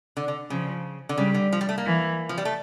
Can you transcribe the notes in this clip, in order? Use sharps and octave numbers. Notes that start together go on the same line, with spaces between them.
D3
D3
C#3 F3
D3
C#3 G3
D3
F3
G3
A3
A#3
E3
F3
G3
A3